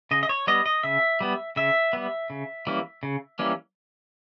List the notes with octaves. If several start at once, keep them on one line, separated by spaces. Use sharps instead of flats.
C#3 D#5
D#5
C#5
G3 B3 D#5
D#5
C#3 E5
G3 B3
C#3 E5
G3 B3
C#3
E3 G3 A#3 C#4
C#3
E3 G3 A#3 C#4